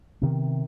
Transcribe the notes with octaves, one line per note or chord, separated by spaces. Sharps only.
C3 D#3 B3